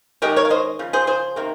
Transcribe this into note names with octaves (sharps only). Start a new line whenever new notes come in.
D#3 G#3 C#4 G4 A#4
A#4 C#5
F5
C5 D#5
C#3 F3
G#4 C5
G#4 C5
C3 D#3 A#3